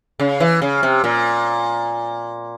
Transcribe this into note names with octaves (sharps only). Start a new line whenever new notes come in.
C#3
E3
C#3
C3
A#2